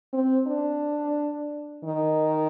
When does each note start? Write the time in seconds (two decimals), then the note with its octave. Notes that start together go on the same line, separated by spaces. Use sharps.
0.13 C4
0.47 D4
1.84 D#3